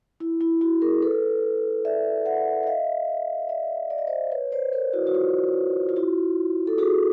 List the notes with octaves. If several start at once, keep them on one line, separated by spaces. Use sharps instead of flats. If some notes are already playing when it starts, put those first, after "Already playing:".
E4
E4
E4 F#4
G#4 A#4
A4 B4
D5 E5
E5 F#5
E5
D#5 F5
D5 E5
D5
D#5
C5 D5
B4 C#5
C5 D5
A#4 C5
E4 F#4
F#4
F4
F4
E4 F#4
A4
F#4 G#4